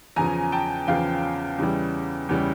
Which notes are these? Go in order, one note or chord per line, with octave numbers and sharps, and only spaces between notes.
E2 C#3 F3 G#5 A#5
G5 A5
E2 C#3 F3 F5 G5
E2 C#3 E3 G3
E2 C#3 E3 G3